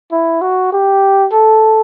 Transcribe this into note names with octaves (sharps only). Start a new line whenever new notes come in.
E4
F#4
G4
A4